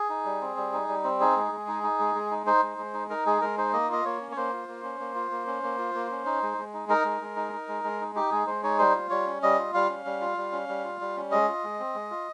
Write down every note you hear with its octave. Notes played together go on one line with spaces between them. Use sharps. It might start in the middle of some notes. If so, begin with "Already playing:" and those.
Already playing: G#4
D#4
G3
C4
G3
D#4
G3
C4
D#4 G#4
G#3
G#3
D#4
D#4
G#3
G#3
D#4
D#4 C5
G#3
G#3
D#4
D#4 A#4
G#3 G#4
G#3 A#4
D#4 C5
A#3 D#5
F4 D#5
A#3 C#5
C#4
C#5
A#3 C5
F4
A#3
C#4
A#3
F4
A#3
C#4
A#3
F4
A#3
C#4
D#4
G#3
G#3
D#4
D#4 A#4
G#3
G#3
D#4
D#4
G#3
G#3
D#4
D#4 G4
G#3 G#4
G#3 C5
D#4 C#5
G3 C5
F4
G3 C#5
C#4
G3 D#5
F4
G3 F5
C#4
G3
F4
G3
C#4
G3
F4
G3
C#4
G#3 D#5
F4
G#3
C4
G#3
F4